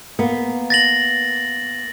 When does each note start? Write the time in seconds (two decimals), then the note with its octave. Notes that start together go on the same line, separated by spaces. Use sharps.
0.19 A#3 B3
0.70 A6 A#6 F#7